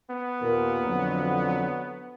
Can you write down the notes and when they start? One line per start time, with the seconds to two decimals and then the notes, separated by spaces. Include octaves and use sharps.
0.10 B3
0.41 D#2 A#2 A#4
0.86 F2 D3 F#3